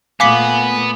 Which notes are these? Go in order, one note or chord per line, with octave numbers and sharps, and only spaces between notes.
A#2 A3 B3 F5 G#5 D6 B6